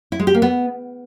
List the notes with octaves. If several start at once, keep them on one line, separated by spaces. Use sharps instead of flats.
E4
G#3
G4
A#3
B3